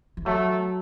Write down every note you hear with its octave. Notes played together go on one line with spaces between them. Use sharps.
E3
F#3 A3